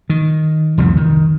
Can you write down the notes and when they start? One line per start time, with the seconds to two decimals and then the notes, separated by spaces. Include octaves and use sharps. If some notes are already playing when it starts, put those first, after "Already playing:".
0.10 D#3
0.78 C2 F2 D#3 E3
0.97 D#3